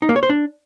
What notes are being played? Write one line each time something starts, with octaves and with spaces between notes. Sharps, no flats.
D#4
A#3
C#5
C5
D4